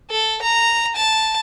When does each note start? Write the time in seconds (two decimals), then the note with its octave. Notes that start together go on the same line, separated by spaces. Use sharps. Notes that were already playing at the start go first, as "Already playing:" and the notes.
0.10 A4
0.42 A#5
0.96 A5